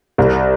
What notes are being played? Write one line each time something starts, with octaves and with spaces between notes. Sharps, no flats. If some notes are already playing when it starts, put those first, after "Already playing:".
C2